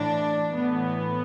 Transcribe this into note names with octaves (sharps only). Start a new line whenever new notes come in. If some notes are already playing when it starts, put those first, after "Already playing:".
Already playing: A2 E3 D4
A2 E3 B3